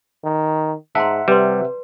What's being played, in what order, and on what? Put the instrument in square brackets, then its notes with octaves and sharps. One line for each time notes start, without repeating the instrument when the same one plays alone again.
[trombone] D#3
[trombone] G#2 [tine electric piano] E5 F#5 [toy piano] A5 A#5 C6
[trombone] C3 [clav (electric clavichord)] G3 [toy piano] B4 D5 C6